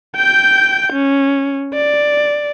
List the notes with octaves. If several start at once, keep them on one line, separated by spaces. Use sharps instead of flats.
G5 G6
C#4
D5